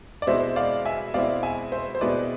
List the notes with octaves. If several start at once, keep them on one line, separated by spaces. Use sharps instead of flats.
D5
B2 G#3 C4 E4 C5 E5
D5 F5
E5 G#5
B2 G#3 C4 E4 D5 F5
E5 G#5
C5 E5
C5
B2 G#3 C4 E4 B4 D5